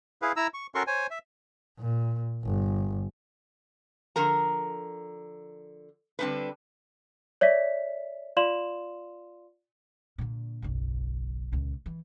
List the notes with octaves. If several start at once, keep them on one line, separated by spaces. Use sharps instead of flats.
E4 G#4 B4 F5
E4 A#5 E6
C#6
C#4 F#4 A4 A#4 C6 C#6
C5 C#5 G#5
E5
A#2
G1
D3 F3 A#4 A#5
D3 G3 C4 D4 D#4 B4
C#5 D5 E5 B6
F4 D5 F5 C6 E7 F#7
A#2 D3
F#1 B1
C#2 A#2
E3